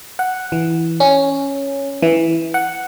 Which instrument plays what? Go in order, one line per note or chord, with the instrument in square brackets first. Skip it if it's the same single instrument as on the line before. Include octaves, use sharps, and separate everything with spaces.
[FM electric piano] F#5
E3
C#4
E3
F#5